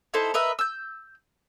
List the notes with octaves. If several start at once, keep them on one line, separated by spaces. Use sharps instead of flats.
D#4 E4 A4 C5
A#4 B4 D#5 E5
E6 G6